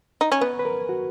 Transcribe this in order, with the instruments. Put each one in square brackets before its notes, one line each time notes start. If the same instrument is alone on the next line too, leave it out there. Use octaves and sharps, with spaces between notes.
[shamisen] D#4
C#4
[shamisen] B3 [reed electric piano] B4
[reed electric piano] B4
A#4
F#4